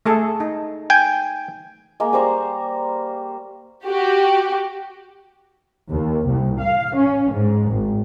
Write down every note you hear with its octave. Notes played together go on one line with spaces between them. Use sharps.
A3 G#4 A4
D#4
G5 G#5
G#3 A#3
G3 C5 A#5 C#6
F#4 G4
D#2
C2
F5
C#4
G#2
G#1